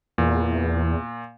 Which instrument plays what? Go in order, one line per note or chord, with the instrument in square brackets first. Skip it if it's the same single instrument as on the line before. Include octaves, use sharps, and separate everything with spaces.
[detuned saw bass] E2 [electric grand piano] A#2